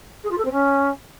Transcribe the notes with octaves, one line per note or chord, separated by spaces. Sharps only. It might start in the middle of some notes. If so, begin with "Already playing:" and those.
G#4
F4
A4
C4
C#4